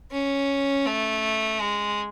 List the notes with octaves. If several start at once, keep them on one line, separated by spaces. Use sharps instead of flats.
C#4
A3
G#3